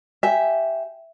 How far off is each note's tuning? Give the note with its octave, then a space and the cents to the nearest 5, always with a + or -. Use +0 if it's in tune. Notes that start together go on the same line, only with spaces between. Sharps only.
G4 -5 E5 +0 G#5 +0